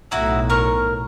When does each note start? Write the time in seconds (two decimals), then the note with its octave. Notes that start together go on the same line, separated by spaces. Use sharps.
0.11 B1 A2 D#4 E4 F#4
0.50 A#4 C#6